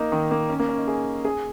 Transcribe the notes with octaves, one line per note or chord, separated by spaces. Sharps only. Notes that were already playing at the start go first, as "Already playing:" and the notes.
Already playing: A#3 D#4
D#3
A#3
C#4
A#3
C#4
D#4
G#4
G#4